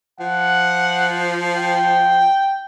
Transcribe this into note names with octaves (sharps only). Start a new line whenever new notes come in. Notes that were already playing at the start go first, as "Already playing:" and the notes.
F3 F#5
G5